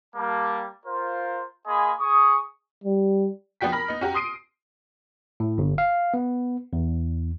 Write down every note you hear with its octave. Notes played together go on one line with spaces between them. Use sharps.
G3 A#3 A5
F4 A#4 C5
A#3 G#4 D#5 G#5 B5 C6
G#4 C#6 D#6
G3
F3 B3 D4 F#4 G5 B6
A#4 B5 F6 A#6
B3 D#4
C#4 F#4 G4 A#5
C6 D#6 C7 D7 D#7
A2
G1
F5
B3
E2